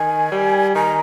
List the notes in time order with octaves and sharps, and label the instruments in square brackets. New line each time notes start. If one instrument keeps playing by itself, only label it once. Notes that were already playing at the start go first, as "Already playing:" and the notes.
Already playing: [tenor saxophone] D#3 [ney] G#5
[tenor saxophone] G3
[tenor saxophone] D#3 [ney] A#5